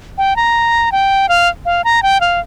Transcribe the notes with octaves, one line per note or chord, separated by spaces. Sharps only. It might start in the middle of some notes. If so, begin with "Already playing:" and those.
G5
A#5
G5
F5
F5
A#5
G5
F5